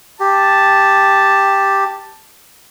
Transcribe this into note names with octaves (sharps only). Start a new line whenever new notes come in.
G4 A5